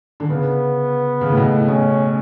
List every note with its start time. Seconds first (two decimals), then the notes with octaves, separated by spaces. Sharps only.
0.20 D3
0.30 C#3 B3
1.21 C#3
1.31 A2
1.37 B2
1.52 A2
1.67 B2 C#4